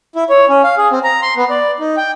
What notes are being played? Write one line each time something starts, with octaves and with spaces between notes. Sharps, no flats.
E4
C#5
C#4
F5
G#4
C4
A#5
C6
B3
D5
D#4
G5